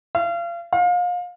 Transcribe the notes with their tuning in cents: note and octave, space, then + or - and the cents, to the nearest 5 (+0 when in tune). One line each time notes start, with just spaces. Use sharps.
F5 -35
F5 +30